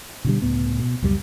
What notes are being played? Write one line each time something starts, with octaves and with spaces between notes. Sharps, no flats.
B2 D3 G3
C#2 A2 B3
B2
C#2 F#2 F3 G3